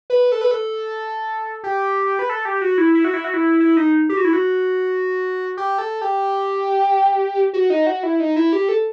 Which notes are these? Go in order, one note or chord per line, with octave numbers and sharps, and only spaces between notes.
B4
A4
B4
A4
G4
B4
A4
G4
F#4
E4
E4
F#4
E4
F#4
E4
E4
D#4
G4
F#4
E4
F#4
G4
A4
G4
F#4
D#4
F#4
E4
D#4
E4
G4
A4